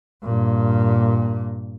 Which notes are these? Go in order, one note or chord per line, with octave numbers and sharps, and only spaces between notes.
G2 A#2